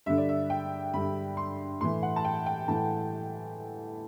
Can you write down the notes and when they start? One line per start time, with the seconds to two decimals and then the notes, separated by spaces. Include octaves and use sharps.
0.06 G2 D3 E5
0.18 D5
0.29 E5
0.50 G5
0.94 G2 D3 B5
1.37 C6
1.81 A2 E3 C6
2.03 F#5
2.16 A5
2.25 G5
2.46 G5
2.68 A2 E3 A5